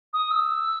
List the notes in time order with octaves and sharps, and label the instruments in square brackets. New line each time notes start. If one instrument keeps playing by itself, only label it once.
[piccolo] D#6
E6